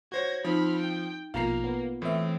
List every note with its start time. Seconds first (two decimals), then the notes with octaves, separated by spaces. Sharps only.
0.12 F#4 C5 C#5 G#6 A#6
0.45 F3 C4 D#4 B5 F6
0.79 G5
1.34 A#1 B2 A#3 F4 F5 A#5 C7
1.64 B3
2.02 A2 E3 C4 E5